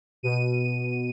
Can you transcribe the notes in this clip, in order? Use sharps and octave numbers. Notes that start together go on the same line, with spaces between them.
B2 D#7